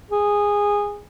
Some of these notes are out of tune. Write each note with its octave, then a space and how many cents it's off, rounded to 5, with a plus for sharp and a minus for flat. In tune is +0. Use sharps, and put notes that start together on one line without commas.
G#4 -15